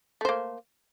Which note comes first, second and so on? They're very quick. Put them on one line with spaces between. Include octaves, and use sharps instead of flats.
A3 C5 A#3